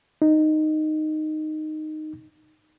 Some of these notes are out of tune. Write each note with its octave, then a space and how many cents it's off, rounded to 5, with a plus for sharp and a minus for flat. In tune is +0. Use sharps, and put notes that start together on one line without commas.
D#4 -10